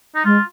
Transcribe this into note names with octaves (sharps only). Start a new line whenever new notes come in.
D#4
G#3 F4